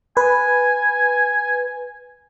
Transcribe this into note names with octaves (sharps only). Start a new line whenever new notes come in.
B4 G#5